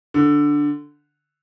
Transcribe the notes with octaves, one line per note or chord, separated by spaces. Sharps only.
D3